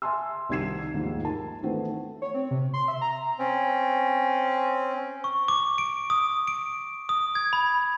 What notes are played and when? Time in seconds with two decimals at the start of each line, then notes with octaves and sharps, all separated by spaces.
0.02 E5 G#5 A5 C6 E6
0.49 C2 C3 D#3 G#6 C7 E7
0.94 D#2 G#2 D#3 F3
1.23 A#4 A5
1.63 D#3 E3 A3 B3 C4
2.22 C#5
2.34 C4
2.51 C3
2.74 C6
2.88 E5
3.01 A#5
3.39 C4 C#4
5.24 C#6
5.48 D6
5.78 D7
6.10 D#6
6.47 D7
7.09 D#6
7.35 G#6
7.53 B5